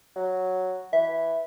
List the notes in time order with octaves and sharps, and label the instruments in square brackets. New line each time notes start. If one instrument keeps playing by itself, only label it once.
[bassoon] F#3
[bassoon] E3 [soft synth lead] E5